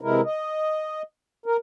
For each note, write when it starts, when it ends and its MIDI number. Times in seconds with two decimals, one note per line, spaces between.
0.01 0.21 48
0.01 0.21 52
0.01 0.21 56
0.01 0.21 64
0.01 0.21 70
0.25 1.02 75
1.46 1.57 70